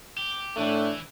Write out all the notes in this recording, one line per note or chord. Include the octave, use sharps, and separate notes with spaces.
G4
A2 E3 A3 D4